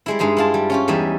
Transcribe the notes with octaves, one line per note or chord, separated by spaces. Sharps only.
G3 G#3 E4
G2 G#3 D#4 D#5 C6
E4 F4 A5
G3
C#4 F4 G4
E2 G3 D#4 E5 G#5